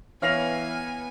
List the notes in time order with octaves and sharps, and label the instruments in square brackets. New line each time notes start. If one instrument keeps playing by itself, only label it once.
[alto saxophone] E3 [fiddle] B3 G#5 [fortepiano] C#5 F5 [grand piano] F6 A#6 F7